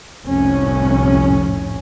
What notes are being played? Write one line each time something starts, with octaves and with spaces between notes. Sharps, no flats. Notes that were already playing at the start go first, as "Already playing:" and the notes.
F1 C2 A2 C#4